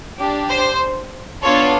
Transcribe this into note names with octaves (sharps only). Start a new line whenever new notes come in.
D4 G4
C5
B3 D4 F4 A4 C#5